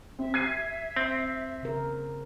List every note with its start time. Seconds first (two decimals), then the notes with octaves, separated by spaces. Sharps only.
0.19 C4 E5
0.34 G#6 C7 D#7
0.96 C4
1.63 C#3 A#4